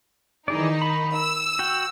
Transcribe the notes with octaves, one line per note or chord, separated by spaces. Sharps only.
D#3 E3 D#4 G#4 D5
B5
E6
F#4 G5